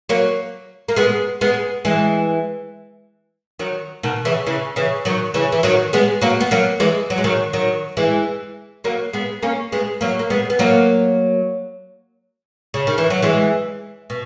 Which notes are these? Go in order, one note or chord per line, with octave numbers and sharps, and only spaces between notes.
F#3 A#3
A#3
G#3 B3
G#3 B3
E3 G#3
D#3 F#3
B2 D#3
C#3 E3
C#3 E3
C#3 E3
D#3 F#3
C#3 E3
E3
D#3 F#3
G#3 B3
F#3 A#3
B3
F#3 A#3
E3 G#3
F#3
G#3
D#3 F#3
D#3 F#3
E3 G#3
F#3 A#3
G#3 B3
A#3 C#4
G#3 B3
F#3 A#3
A#3
G#3 B3
B3
F#3 A#3
C#3
D#3
E3
F#3
E3 G#3
B2